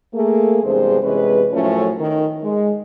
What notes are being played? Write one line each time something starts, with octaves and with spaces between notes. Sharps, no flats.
A3 A#3 G#4
E2 G2 C3 G#3 G#4 C5
E2 C3 G#3 C#4 B4
F#2 A2 F3 A3 C#4
D#3
G#3